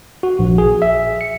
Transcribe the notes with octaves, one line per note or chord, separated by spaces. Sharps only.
F#4
A#1
G#4
E5
C#7